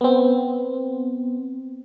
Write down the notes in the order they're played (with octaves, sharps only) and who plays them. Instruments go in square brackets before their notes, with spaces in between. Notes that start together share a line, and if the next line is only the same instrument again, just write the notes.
[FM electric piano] B3 C4